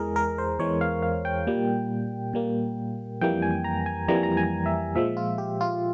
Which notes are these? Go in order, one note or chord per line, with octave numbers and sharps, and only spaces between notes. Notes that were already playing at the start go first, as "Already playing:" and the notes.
Already playing: E2 E3 G#3 G#4 A#4
A#4
C5
E2 E3 G#3 C#5
F5
F5
G5
A#2 G3 A#3
A#2 G3 A#3
F2 E3 G3 A#3 G5
G#5
A#5
G#5
F2 E3 G3 A#3 A#5
G#5
A#5
G#5
E5
A#2 F3 G#3 E5
F4
G4
F4